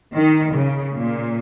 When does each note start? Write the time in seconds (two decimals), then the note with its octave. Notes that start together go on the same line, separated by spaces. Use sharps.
0.15 D#3
0.55 C#3
0.96 A#2